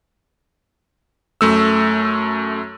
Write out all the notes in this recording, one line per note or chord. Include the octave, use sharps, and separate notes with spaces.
F#2 A3 E6